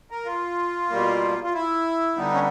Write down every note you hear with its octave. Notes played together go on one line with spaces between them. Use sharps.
A#4
F4
B2 G3 A#3
F4
E4
D3 G3 B3 D#4
C#4